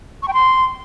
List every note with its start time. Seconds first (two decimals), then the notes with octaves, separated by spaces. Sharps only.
0.22 C#6
0.28 G5
0.34 C6